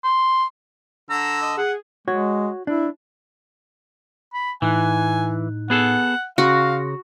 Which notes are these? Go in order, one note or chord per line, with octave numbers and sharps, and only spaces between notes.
C6
D3 A#5 E6
D#5
G#4 F#5
G#3 F#4 C#5
D4 E4
B5
A2 E3 D#4 G#5 F#6
B3 G#4 A4 F#5
C#3 F#4 F5 C6 A#6